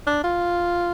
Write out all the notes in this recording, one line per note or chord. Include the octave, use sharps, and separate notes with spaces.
D4
F4